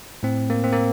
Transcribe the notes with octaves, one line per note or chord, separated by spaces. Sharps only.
A2 C4
A#3
C4
A#3